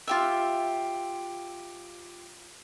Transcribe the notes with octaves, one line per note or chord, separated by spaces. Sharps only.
F4 G4 E5